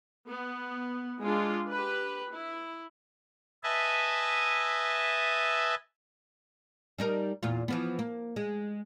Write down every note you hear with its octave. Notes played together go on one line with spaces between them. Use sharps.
B3
G#3 D4 F4
G4 B4
E4
B4 D#5 E5 G#5 A5
G3 D#4 A#4
E2 A#2 F4
E3 F3 B3
A#3
G#3